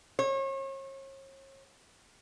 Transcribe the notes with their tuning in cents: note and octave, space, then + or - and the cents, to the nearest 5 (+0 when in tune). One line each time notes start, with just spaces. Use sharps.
C#5 -40